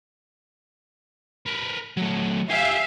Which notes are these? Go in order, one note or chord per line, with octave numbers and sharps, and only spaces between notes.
A#4 B4
F#3 A3
G4 E5 F5 G#5